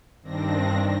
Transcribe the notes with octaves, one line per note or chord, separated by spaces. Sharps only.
G2 D#3 C4 D4 A#6